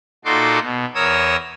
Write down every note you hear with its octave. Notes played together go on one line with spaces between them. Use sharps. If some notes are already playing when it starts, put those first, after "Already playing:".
A#2 D#4 F#4 A4 C6 D6
B2
E2 A#4 C#5 D#6 E6